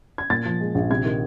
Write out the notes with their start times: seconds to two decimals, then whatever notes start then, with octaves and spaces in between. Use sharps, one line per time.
0.18 G#6
0.30 A#2 A6
0.45 F3
0.61 G#3
0.75 A#1
0.90 C3 G#6
1.05 D#3